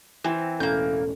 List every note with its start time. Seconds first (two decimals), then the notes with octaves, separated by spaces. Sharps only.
0.24 E3 C4
0.60 E1 A1 A#3 C#4 A4 G6